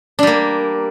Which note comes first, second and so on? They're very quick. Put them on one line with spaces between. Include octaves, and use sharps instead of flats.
D4 G3 A#3